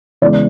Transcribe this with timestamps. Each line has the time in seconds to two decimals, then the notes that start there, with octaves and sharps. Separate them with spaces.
0.22 C#3 E3 G#3 B3 D5